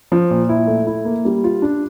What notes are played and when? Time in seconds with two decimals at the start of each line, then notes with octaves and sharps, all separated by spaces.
0.12 F3
0.30 A#2
0.49 E4
0.67 A3
0.87 E4
1.05 A#3
1.25 G3
1.44 F4
1.62 D4